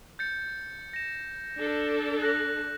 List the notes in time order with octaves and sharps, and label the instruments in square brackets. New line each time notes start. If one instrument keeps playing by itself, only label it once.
[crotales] G6 A6 C#7
A#6 E7
[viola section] D4 A4
[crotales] F#6 A#6 F#7